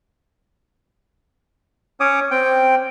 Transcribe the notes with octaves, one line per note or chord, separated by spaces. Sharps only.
C#4 C#5 D6 D#6
C4 G5